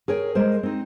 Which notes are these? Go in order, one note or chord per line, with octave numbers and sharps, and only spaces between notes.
G#4 A#4 C#5 G5
G#3 A#4 C5
C4 D#4